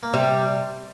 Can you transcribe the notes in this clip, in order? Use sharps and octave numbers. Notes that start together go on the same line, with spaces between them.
A#3
C3 G3 C4